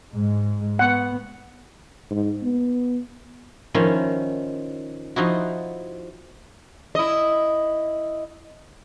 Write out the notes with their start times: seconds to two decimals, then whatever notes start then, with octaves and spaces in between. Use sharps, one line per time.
0.13 G#2 G#3
0.79 B3 F#5
2.11 G#2
2.43 B3
3.74 D#3 F3 C#4 E4
5.16 F3 D#4 E4 F#4
6.95 E4 D#5